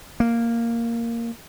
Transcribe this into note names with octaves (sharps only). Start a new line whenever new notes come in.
A#3